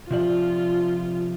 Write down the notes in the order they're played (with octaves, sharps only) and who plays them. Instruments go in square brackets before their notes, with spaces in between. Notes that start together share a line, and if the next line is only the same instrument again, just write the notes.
[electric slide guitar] C3 F3 D5 [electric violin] F4